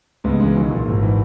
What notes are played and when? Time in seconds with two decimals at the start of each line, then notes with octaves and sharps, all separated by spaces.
0.24 C#2 G#3 B3
0.40 C#3 E3 G#3
0.56 B1 F#3
0.71 A#2
0.87 G#1
1.03 E3